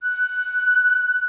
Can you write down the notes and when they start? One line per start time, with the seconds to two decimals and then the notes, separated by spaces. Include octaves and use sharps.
0.01 F#6